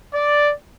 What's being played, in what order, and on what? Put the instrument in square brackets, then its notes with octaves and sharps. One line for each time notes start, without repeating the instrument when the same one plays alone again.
[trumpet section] D5